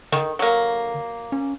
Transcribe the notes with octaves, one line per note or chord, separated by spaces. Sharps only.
D3 D#3
F#3 A#3
C#4